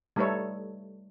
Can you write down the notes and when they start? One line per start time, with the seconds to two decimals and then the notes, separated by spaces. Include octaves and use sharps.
0.16 G3 A3 D#4 A4 B4 C#5